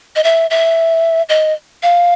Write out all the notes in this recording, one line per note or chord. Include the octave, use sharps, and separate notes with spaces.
D#5
E5
E5
D#5
F5